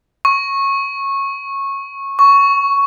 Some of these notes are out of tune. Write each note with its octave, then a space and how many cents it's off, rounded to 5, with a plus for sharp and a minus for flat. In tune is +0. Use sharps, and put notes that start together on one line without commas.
C#6 -15
C#6 +10